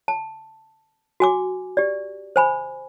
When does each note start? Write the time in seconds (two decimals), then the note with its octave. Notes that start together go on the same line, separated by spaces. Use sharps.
0.08 A5
1.20 F#4 G#5 D6
1.77 G4 D5
2.36 C5 G#5 B5